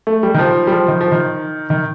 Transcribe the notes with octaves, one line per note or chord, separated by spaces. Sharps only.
A3
G3
D#3
F3
G3
F3
D#3
F3
D#3
D#3